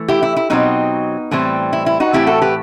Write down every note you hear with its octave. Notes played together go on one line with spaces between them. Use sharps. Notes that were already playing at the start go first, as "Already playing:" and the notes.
Already playing: E3 A3
E4 G4
E4
E4
B2 F#3 C4 D#4
A2 E3 G3 C4
E4
E4
D#4 F#4
A2 E3 A3 C4 E4 G4
F#4 A4
G4 B4